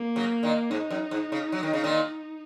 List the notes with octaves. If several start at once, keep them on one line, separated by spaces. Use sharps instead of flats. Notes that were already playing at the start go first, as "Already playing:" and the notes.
Already playing: A#3
C#3 F#3
A#2 D#3
G#2 D#4
F#2
G#2
C#3
F#3
D#3
C#3
A#2 D#3